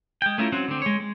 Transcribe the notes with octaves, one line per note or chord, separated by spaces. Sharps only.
G#3 G5
A3 C#4 E4 F4 A#4
F#3 C4 C#4 F#4
D3 C4
G#3 C#5
G#3